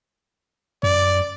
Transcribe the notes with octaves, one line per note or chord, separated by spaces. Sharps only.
F#2 D5